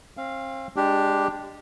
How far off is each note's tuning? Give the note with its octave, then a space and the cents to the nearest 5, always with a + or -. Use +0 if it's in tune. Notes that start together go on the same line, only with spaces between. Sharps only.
C4 +35 F5 -5
G#3 -20 D4 +0 G4 +0